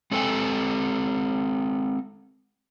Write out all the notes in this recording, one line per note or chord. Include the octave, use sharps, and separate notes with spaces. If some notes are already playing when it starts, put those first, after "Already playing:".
G#3 C4 A4 C#5 G5 G#5